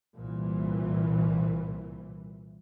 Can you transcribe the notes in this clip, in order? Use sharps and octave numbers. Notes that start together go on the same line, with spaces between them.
C2 A#2 E3